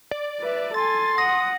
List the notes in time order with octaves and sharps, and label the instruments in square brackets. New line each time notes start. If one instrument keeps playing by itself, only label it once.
[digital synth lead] D5
[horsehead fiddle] B4 E5
[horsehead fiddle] A4 G#5 [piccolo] C6 [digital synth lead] A6
[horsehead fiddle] F#5 [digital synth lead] D#6 [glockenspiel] A#6